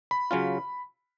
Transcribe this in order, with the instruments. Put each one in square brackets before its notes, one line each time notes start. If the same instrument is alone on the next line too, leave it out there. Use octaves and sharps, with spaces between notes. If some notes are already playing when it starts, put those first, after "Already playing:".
[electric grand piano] B5
[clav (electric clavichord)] C#3 F#3 C#4 F4